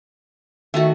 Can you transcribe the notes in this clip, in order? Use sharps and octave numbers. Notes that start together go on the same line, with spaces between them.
D#3 A3 F#4 E5